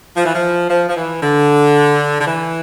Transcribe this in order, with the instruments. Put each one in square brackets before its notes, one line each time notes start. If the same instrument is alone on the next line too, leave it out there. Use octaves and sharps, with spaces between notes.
[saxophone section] F3
E3
F3
F3
F3
E3
D3
D3
E3